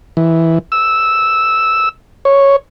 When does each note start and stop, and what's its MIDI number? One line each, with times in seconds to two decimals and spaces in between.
0.17 0.59 52
0.72 1.89 88
2.25 2.56 73